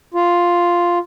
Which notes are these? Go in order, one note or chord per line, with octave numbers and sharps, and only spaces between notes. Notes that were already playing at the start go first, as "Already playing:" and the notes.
F4